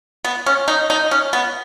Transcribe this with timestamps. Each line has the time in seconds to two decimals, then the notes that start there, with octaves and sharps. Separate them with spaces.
0.24 B3
0.46 C#4
0.68 D#4
0.90 D#4
1.11 C#4
1.33 B3